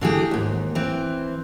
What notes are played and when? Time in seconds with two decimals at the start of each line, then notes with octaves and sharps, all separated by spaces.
0.01 D3 E3 G4 G#4
0.31 D#2 G#2
0.75 E3 C4